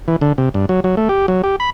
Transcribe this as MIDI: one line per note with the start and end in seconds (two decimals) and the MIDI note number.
0.08 0.16 52
0.21 0.33 50
0.38 0.49 48
0.54 0.66 43
0.69 0.80 54
0.84 0.95 54
0.97 1.08 57
1.09 1.26 67
1.28 1.42 54
1.44 1.56 67
1.60 1.70 83